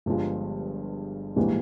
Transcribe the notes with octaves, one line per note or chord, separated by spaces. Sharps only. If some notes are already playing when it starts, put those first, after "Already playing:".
G1 G2 F3 G#3
A#1 G#2 E3 G3 A#3